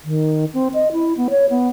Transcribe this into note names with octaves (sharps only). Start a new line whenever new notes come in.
D#3
C4
D#5
E4
B3
C#5
B3